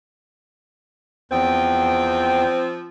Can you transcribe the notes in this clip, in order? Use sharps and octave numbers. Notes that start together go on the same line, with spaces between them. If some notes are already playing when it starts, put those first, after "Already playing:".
E2 F3 C4 G5